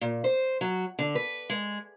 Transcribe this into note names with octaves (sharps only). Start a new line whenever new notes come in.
A#2
C5
F#3
D3
B4
G#3